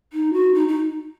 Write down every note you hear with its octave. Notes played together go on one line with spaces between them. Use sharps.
D#4
F#4
D#4
D#4